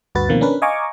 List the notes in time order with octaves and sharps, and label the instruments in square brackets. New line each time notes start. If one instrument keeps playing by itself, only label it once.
[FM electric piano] D2 G2 F#4 B4 A6
B2 D#3 F3 A#3 C4
C#4 D4 A#4 B4
D#5 F5 G#5 A#5 C#6 D6